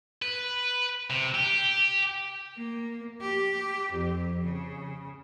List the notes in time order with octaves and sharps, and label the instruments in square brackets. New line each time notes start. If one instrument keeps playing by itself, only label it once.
[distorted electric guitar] B4
C3
G4
[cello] A#3
G4
F2
C#3